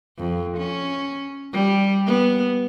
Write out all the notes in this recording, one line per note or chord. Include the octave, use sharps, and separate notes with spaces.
F2
C#4
G3
B3